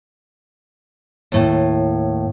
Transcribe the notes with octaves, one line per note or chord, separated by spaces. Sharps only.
D#2 A2